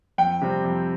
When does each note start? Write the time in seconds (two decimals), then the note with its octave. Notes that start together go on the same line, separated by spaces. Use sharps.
0.18 F2 G5
0.42 C3 G3 C4
0.64 F2